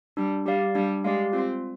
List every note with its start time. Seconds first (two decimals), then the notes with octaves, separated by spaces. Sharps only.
0.17 G3 D4
0.46 G3 G4 D5 F5
0.75 G3 D4
1.04 G#3 G4 D5 F5
1.33 C4 F4